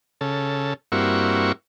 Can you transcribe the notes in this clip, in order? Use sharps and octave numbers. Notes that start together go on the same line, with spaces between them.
C#3 A4
G2 A#3 C4 E4 F#4 C#6